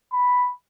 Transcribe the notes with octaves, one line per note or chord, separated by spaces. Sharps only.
B5